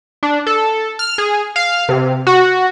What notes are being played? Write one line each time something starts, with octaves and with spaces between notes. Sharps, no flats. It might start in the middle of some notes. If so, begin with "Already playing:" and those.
D4
A4
F6
G#4
F5
C3
F#4